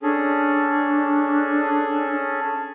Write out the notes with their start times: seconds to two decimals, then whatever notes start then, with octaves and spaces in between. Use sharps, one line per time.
0.03 C#4 D4 G#4 A4